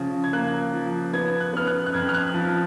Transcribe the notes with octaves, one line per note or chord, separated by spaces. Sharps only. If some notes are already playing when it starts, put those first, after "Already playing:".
Already playing: C#3 F3
G#6
A#3 F#6
F3
B3 G#6
F#6
B3 F6
F#6
F#6
F2 G#6
F6
F#6
F3